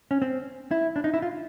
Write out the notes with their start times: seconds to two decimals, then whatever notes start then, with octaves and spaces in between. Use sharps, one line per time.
0.11 C#4
0.22 C4
0.71 E4
0.96 D4
1.04 D#4
1.14 E4
1.22 F4